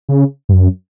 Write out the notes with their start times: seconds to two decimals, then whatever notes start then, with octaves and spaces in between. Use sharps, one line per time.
0.09 C#3
0.49 G2
0.53 F#2